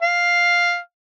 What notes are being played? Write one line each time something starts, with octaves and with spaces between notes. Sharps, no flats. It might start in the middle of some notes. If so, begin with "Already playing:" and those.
F5